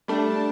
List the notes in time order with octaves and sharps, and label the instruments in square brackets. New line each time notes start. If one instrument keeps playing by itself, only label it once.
[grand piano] G3 A3 [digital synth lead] D4